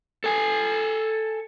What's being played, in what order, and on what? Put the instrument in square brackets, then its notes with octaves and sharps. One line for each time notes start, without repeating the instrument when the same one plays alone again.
[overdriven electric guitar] A4 G#5